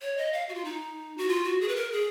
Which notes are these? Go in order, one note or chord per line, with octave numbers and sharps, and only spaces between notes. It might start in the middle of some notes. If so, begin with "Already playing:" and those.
C#5
D#5
F5
F#4
F4
D#4
F#4
F4
F#4
G#4
B4
A#4
G#4